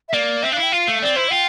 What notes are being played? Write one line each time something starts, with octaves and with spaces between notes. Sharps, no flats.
E5
A#3 D5
C4 E5
D4 F5
E4
G5
F4 F5
A3
C4 D5
E4 C5
F4 G5